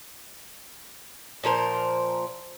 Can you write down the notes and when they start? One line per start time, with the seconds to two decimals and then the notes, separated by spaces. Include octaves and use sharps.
1.44 A#2 F3 A#4 C5